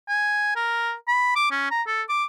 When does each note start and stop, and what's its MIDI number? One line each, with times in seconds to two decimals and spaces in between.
0.08 0.51 80
0.56 0.93 70
1.08 1.32 83
1.36 1.49 86
1.51 1.68 61
1.71 1.82 82
1.87 2.02 69
2.09 2.24 86